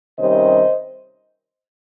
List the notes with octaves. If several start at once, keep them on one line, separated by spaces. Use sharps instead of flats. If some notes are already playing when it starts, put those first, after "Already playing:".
C3 D#3 G3 C#4 C5 D#5